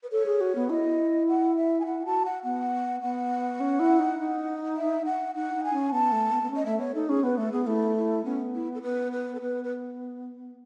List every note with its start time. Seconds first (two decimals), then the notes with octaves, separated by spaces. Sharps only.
0.03 B4
0.12 A4 C#5
0.26 G#4
0.41 F#4
0.55 B3
0.70 E4 D#5
1.29 F#5
1.57 E5
1.80 G#5
1.86 E4 F#5
2.05 F#4 A5
2.25 F#5
2.43 B3 F#5
3.02 B3 F#5
3.60 C#4
3.80 E4
3.99 D#4
4.19 D#4
4.76 E5
5.05 F#5
5.35 D#4 F#5
5.54 D#4
5.64 G#5
5.73 C#4
5.92 B3 A5
6.12 A3
6.31 B3
6.42 B3
6.51 C#4
6.56 D#5
6.65 A3 E5
6.79 B3 C#5
6.94 D#4 A4
7.09 C#4 G#4
7.23 B3 B4
7.38 A3 A4
7.52 B3 G#4
7.66 A3 E4
7.96 E4
8.24 B3 C#4
8.55 E4
8.75 A4
8.82 B3 B4
9.12 B4
9.35 A4
9.41 B3 B4
9.64 B4